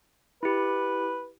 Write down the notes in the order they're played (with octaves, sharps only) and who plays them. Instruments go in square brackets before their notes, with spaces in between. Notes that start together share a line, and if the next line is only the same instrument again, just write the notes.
[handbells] E4 G4 [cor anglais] B4